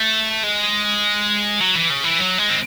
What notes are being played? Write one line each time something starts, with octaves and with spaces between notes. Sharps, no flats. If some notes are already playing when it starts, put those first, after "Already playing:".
Already playing: A3
G#3
F#3
E3
C#3
E3
F#3
G#3
C4